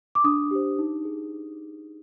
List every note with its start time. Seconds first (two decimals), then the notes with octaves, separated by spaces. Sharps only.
0.15 D6
0.24 D4 D#6
0.51 G4 C5
0.79 D#4
1.05 G#4